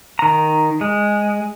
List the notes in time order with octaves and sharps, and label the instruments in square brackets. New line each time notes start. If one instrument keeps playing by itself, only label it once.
[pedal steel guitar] D#3 A#5
G#3